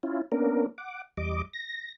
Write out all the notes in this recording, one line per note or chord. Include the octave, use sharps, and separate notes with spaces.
C#4 E4 F4
A#3 B3 C#4 D4 A#4
F#5 D6
E2 G3 D#5 D6
A#6